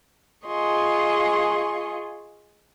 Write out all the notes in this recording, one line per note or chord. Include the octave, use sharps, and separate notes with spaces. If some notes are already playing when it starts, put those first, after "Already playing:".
F4 G#4 D#5 C6 C#6